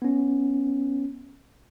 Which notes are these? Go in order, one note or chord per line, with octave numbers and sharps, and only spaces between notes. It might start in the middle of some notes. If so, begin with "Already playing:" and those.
B3 C#4